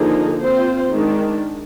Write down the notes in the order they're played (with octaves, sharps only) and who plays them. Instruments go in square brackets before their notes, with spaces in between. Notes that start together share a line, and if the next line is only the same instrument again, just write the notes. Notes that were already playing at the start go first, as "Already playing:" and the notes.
Already playing: [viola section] D3 F3 A#3 D#4 G#4
C4 F4 C5
D#3 G#3 D4